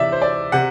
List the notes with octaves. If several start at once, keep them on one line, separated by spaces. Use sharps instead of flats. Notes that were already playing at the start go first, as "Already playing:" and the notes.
Already playing: C3 E3 D5 E5
C5
D5
C3 F#5